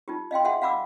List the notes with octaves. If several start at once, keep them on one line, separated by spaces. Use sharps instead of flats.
D#4 F4 G4
D#5 F5 G5 C6
G#4 E5 F#5 G#5 C6
F5 F#5 B5 D6 E6